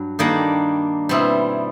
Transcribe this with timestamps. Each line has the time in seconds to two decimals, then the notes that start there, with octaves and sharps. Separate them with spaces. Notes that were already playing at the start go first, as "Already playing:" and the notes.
Already playing: G2 F#3
0.19 D#3 G3 A#3 D4
1.09 B2 G3 C4 E4